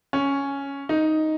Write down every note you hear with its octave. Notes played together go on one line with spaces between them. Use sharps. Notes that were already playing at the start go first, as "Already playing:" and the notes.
C#4
D#4